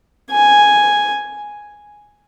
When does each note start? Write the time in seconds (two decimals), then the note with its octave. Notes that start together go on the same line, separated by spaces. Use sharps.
0.32 G#5